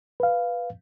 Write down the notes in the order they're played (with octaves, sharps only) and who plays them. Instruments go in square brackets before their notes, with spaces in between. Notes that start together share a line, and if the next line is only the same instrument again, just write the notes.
[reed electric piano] B4 F5